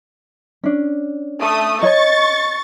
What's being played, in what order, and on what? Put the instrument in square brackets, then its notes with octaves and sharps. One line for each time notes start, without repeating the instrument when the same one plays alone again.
[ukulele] C#4 D4
[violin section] A3 D#6
[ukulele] C#5 D#5 [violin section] C#6 A6